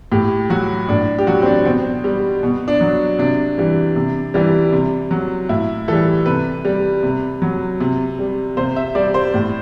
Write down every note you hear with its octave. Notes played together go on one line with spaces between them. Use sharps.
A2 G4
F#3 F#4
A2 D4
G4
F#3 F#4
C4
D4
B2 C4
G3
B2
D4
F#3
C3 D4
E3 G3
C3
E3 G3
C3
F#3
A2 E4
E3 G3 A4
C3 B4
G3
C3
F#3
C3
G3
C3 C5
E5
G3 D5
C5
A2